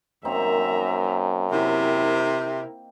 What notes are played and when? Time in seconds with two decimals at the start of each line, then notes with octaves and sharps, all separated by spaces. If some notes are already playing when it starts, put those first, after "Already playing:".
0.25 F#2 A#3 C4 D#4 E5 A#5
1.52 C3 E4 A#4